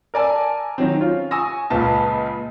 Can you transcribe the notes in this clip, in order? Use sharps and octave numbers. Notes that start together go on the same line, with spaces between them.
A#4 D5 G#5 A5 E6
D#3 F#3 C4
C#4 F4
G#5 C#6 D#6 E6 A#6
C#2 A#2 F4 B4 A5